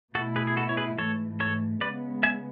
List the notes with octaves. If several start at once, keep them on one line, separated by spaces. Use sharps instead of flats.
B2 A3 E4 F#4 A4
G#4 B4
G#4
F#4 A4
C#5
G#4 B4
G#2 E3 A3 A4 C#5
A4 C#5
C#3 G#3 B3 B4 D5
E5 G#5